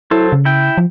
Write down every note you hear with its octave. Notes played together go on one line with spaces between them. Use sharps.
F#3 E4 A4 C5
C#3
E4 G5
F3